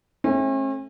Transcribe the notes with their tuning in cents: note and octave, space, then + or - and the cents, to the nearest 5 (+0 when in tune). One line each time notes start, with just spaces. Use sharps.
A3 -30 C#4 -45